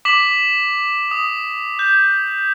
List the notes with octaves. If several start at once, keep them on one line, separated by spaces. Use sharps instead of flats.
D6 B6 F#7
D#6
G6